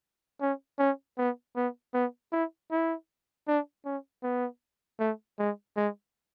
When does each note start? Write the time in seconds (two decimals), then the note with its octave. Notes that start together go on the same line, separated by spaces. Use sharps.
0.41 C#4
0.79 C#4
1.18 B3
1.56 B3
1.94 B3
2.32 E4
2.71 E4
3.47 D4
3.85 C#4
4.23 B3
4.99 A3
5.39 G#3
5.77 G#3